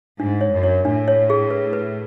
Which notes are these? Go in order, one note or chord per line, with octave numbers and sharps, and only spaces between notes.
G#2 D4
C#5
F#2
C#5
A2 D4
C#5
G#4
B4
B4